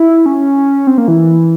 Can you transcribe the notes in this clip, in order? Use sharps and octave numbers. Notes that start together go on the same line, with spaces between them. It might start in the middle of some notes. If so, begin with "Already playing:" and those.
Already playing: E4
C#4
C4
A#3
E3